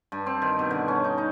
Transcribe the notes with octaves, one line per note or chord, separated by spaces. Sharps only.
G2
C4
D#3
B2
D3
C#4
D#4
D#4